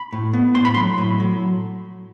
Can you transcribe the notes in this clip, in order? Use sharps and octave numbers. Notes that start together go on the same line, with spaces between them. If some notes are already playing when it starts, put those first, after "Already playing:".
Already playing: B5
A2
B3
A2 C6
B5
F#3 C6
A2
F#3